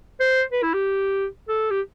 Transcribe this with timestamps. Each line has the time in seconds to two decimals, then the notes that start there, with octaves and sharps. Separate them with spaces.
0.20 C5
0.52 B4
0.63 E4
0.74 G4
1.49 A4
1.71 G4